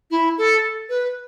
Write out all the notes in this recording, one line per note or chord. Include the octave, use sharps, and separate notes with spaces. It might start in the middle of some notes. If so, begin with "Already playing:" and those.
E4
A4
B4